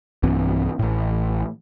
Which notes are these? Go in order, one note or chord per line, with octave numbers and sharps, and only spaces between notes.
B1 G2 E3 C4
A1 A2